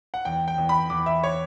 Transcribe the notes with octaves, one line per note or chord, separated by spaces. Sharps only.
F#5
E2 G5
G5
E2
B5
E2 D6
E5
C#5